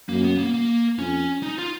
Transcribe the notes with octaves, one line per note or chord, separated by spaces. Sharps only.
F#2 A#3
B3
A#3
A#3
F2 C#4
D#4
F4